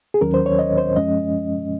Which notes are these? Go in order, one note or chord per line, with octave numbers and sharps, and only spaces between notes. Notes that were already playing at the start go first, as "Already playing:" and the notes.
G#4
D#2 D#3 F#3 C#4 A#4
C5
C#5
D#5
C5
F#2 F3 G#3 C#4 D#5